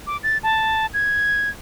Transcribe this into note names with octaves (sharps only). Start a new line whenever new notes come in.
D6
A6
A5
G#6